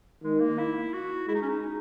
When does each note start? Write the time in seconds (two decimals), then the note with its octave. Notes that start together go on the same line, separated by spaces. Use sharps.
0.23 D#3 G#3
0.40 A#3
0.58 E4
0.94 F#4
1.28 G#3 E4
1.35 D#4
1.42 C#4
1.49 D#4